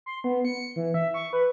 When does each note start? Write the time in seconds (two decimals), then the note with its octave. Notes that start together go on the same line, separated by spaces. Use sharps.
0.06 C6
0.24 B3
0.45 C#7
0.76 E3
0.94 E5
1.14 C#6
1.33 B4